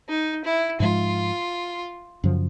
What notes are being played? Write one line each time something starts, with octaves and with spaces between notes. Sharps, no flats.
D#4
E4
G#2 F3 G#3 F4
F#2 C#3 F3